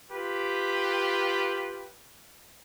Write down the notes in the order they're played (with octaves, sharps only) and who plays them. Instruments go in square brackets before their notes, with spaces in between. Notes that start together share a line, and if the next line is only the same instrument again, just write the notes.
[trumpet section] F4 G4 B4